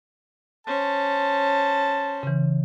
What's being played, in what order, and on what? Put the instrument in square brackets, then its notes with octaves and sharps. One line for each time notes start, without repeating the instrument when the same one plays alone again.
[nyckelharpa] C#4 C5 [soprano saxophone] A5
[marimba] C#3 E3